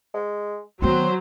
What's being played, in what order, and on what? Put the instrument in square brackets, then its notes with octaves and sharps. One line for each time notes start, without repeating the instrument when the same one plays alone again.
[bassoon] G#3
[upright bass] D#3 B3 [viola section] F#3 [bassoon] C4 [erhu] C5